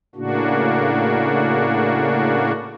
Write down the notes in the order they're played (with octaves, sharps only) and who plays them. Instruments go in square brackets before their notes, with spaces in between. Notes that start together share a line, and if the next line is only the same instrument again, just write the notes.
[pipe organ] A2 C#3 A#3 D4 F#4